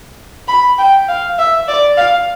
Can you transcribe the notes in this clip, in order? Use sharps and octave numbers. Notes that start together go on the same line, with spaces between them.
B5
G5
F5
E5
D5
F5